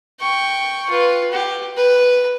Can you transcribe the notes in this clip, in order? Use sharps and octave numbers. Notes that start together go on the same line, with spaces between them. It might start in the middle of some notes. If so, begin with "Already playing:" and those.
G5 C#6
F4 B4
G4
B4